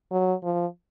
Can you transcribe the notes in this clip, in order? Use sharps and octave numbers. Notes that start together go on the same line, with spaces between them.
F#3
F3